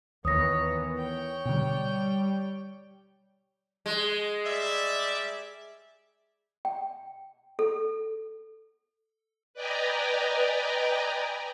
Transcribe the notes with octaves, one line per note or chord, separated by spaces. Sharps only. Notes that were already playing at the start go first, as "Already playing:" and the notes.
D#2 D#3 E3 B3 C#5 D#6 A#6
C#5 G5
B2 D3 G3
G#3
G3 D5 E5
G5
A4
B4 D5 D#5 G5 G#5 A#5